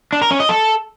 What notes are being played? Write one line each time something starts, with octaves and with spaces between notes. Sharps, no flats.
D4
A#4
C#4
D#5
A4